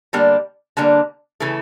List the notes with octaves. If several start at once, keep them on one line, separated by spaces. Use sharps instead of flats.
D3 G3 A#3 D4
D3 G3 A#3 D4
C#3 E3 A3